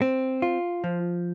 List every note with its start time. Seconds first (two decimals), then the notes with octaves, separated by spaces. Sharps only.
0.02 C4
0.42 F4
0.84 F3